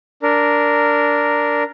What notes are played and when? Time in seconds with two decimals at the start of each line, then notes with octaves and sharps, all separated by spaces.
0.23 D4 A#4